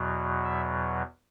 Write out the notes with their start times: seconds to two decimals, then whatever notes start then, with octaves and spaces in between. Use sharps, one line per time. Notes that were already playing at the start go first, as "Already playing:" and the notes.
Already playing: E2 B2 F#3
0.43 E5